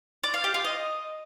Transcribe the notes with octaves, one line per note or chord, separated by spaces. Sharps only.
D5
F5
G4
F4
D#5